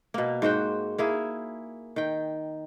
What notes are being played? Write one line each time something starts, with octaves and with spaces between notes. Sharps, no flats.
B2 A#3
G#2 F#4 C5 G5
A#3 E4 G#4
D#3 G5